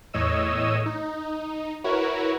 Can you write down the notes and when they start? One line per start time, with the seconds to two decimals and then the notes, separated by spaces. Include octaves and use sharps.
0.14 E2 A2 C#5 D#5 E6 D#7
0.86 D#4
1.84 E4 F#4 A#4 B4 C#5